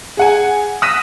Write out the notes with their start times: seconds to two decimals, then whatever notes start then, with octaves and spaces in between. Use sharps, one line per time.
0.17 G#4 F#5 G#5
0.82 D#6 F#6 A#6 B6 D#7 E7